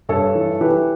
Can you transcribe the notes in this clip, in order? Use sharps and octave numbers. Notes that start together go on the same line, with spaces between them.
G2 A4 C#5
E3
E3 G4 B4